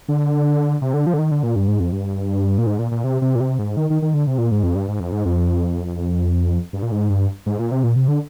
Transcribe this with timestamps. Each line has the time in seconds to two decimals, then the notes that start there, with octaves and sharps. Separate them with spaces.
0.08 D3
0.82 C3
0.94 D3
1.07 F3
1.14 D3
1.19 D#3
1.31 D3
1.43 A#2
1.56 G2
1.68 G#2
1.80 F2
1.92 G2
2.58 A#2
2.67 G#2
2.79 A#2
2.92 A#2
3.04 C3
3.22 C3
3.35 A#2
3.40 C3
3.59 G#2
3.77 D#3
3.90 D#3
4.02 D#3
4.14 D3
4.27 C3
4.38 A#2
4.51 G#2
4.63 F2
4.75 G2
4.88 G#2
5.00 F2
5.12 G#2
5.25 F2
6.73 G2
6.83 A#2
6.92 G#2
7.10 G2
7.46 G#2
7.59 A#2
7.72 C3
7.84 A#2
7.96 C3
8.08 D3